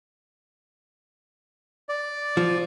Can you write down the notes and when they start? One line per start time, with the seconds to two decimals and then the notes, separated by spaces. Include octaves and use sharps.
1.89 D5
2.37 F3